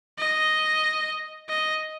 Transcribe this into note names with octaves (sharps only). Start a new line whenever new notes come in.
D#5
D#5